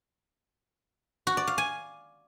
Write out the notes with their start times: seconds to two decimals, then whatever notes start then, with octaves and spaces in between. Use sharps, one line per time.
1.27 F#4
1.37 D5
1.47 F5
1.58 G#5